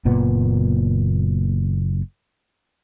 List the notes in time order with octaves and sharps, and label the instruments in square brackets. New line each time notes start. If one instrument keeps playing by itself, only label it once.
[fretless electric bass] F#1 A#2 B3